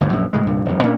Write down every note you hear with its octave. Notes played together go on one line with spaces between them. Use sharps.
G1 D2 G#2
A#1 F#2
A2 C#3 G#3
C2 G2 A#2
E1 F#2
A#2 A#3 C#4 D4